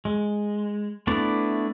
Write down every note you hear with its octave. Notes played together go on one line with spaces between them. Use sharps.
G#3
A3 B3 D4 E4 D5